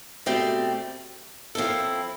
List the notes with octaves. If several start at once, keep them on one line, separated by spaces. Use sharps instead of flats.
B2 A3 C4 G4 D5
F3 C4 E4 A4